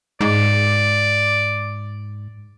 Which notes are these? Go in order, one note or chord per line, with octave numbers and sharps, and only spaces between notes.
G#2 D5